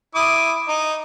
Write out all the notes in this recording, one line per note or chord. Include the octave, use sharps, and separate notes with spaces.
E4 D6 D#6
D#4